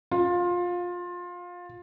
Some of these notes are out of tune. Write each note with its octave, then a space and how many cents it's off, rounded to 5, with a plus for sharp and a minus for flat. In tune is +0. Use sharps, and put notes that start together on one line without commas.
F4 +20